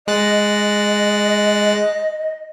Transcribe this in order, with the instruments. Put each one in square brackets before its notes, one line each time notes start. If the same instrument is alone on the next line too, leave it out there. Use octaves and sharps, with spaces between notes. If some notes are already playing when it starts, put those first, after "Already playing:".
[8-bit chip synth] G#3 F#6 A6 [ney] D#5